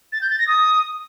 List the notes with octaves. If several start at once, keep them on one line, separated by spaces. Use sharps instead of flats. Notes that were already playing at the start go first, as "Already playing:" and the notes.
A6
G6
A6
A#6
D#6